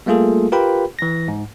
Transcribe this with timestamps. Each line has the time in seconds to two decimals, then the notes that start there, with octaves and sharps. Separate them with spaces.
0.06 G3 A3 A#3 F4 G#4 A4
0.52 F4 G4 A#4 B4 G5 B5
0.99 E3 A#6
1.28 G#2